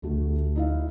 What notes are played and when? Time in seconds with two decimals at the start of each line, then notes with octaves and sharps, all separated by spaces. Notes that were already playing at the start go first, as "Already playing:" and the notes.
0.02 D2 D3 A3 F#4
0.56 D#4 E4 F5